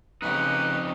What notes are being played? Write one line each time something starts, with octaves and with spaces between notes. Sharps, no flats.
F2 C#3 D#4 G4 B4